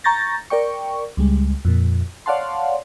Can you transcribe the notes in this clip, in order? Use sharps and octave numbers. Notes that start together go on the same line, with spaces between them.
A#5 C#6 G6 A6 A#6
A#4 D5 G5 C#6
C#2 G3 G#3
F2 A#2
C#5 D5 F5 F#5 A5 C6